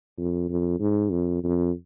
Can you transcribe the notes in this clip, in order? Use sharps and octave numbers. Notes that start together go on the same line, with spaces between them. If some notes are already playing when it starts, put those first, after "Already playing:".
F2
F2
G#2
F2
F2